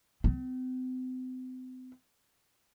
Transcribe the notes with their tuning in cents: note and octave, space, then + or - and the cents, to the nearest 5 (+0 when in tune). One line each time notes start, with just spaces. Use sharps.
C4 -40